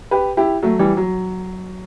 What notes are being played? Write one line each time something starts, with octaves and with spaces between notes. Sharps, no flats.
G4 B4
E4 G4
F#3 A3
E3 G3
F#3